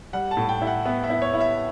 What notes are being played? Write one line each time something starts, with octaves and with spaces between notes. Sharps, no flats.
G3 F#5
A5
A2
G5
E4
F#5
B3 E5
E5
E4
C#5
E4
E5